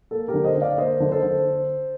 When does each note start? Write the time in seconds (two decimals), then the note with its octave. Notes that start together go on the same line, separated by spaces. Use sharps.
0.11 A#3 A4
0.28 G4 A#4
0.34 D3
0.44 C5 D#5
0.56 D3
0.62 D5 F5
0.78 A#3 C5 D#5
1.00 D3
1.12 A4 C5
1.23 D3